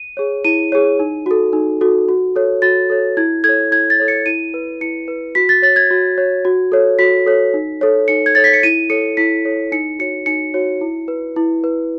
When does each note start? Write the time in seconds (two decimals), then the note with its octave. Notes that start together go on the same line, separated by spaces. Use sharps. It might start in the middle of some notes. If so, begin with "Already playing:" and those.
Already playing: D#7
0.17 G#4 C#5
0.44 E4 D#7
0.72 G#4 C#5
0.99 D#4
1.26 F#4 A4
1.53 D#4
1.81 F#4 A4
2.09 F#4
2.36 A4 C#5
2.62 F#4 A6
2.90 A4 C#5
3.17 E4 G#6
3.44 A4 C#5 G#6
3.71 E4 G#6
3.90 A6
3.99 A4 C#5
4.08 C#7
4.26 E4 D#7
4.54 B4
4.81 E4 C#7
5.08 B4
5.35 F#4 B6
5.49 A6
5.62 C#5 A6
5.76 G#6
5.91 F#4
6.18 C#5
6.45 F#4
6.72 A4 C#5
6.99 F#4 B6
7.26 A4 C#5
7.54 D#4
7.81 A4 C#5
8.08 D#4 C#7
8.26 G#6
8.35 A4 C#5 A6
8.44 B6
8.53 C#7
8.63 E4 D#7
8.90 A4 C#5 C#7
9.17 E4 B6
9.45 A4 C#5
9.72 D#4 C#7
9.99 F#4 C#5 C#7
10.26 D#4 C#7
10.54 F#4 C#5
10.81 E4
11.08 B4
11.36 E4
11.64 B4